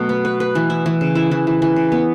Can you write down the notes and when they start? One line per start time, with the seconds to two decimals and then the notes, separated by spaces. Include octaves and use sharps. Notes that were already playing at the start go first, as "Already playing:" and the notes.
Already playing: B2 F#3 A3
0.09 B3
0.25 B4
0.40 B4
0.55 E3
0.70 E4
0.86 E3
1.01 C#3
1.15 E4
1.31 E3
1.47 E3
1.62 E3
1.76 C#3
1.92 B3